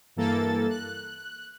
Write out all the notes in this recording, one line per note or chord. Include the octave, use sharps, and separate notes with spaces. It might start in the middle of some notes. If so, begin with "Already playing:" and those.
G2 E3 A#3 A4 A6
F#6